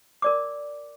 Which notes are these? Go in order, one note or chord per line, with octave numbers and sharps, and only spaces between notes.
A#4 D5 D6